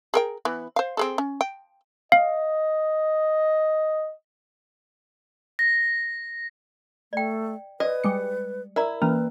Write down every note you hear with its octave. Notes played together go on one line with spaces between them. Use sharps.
G#4 A#4 G5
E3 B3
C5 F5
C4 G#4 A4
C#4
G5
D#5 F5
A#6
A3 D5 G5
B4 D5 D#5
G3 G#3 C#7
E4 A#4 D5 A#5
E3 A#3 C#4 B4